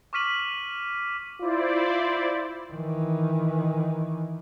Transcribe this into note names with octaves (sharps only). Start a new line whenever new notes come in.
C#6 D6 F6 B6 D#7 F#7
E4 F4 C5 D5
D#3 E3